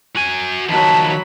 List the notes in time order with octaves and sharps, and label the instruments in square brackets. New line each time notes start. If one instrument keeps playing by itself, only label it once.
[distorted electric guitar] F#4 G#5
[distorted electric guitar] D#3 F3 [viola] F#3 B5 [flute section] A5